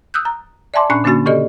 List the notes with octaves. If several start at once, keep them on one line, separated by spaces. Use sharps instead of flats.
D#6 E6 F#6 G6
A#5
D5 E5 G#5 A5 C6 D6
A#2 C#4 D4 G#5 C#6 F#6
D3 A#3 C#4 D4 F#4 A6
C#3 G4 A4 D5 D#5